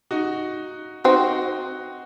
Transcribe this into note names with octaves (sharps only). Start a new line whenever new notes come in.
D#4 F#4
C4 D#4 F#4